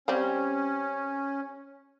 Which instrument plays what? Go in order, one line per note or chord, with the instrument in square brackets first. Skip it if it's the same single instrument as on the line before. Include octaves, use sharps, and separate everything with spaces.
[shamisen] G3 C4 [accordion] C#4